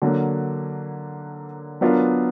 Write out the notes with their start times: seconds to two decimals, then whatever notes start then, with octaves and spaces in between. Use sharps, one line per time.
0.02 D3 F#3 A#3 D4
1.81 F#3 B3 D4 F4 A#4